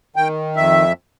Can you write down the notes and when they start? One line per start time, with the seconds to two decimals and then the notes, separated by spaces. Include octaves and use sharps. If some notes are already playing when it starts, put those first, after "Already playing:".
0.16 D#3 G5
0.56 F2 E5